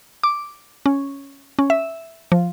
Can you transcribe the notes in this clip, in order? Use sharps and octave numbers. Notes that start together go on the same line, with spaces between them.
D6
C#4
C#4
E5
F3